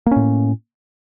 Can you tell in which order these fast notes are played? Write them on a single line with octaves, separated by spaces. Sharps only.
A#3 C#4 A2